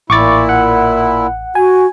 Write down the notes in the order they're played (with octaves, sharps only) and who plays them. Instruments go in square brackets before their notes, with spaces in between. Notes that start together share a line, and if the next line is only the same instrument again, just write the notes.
[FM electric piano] A1 [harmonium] A#2 E4 [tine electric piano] C#6 D6 A6
[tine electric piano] F#5
[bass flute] F#4 [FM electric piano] G#5